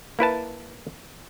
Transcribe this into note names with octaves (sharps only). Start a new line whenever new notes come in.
A#3 E4 B4 A5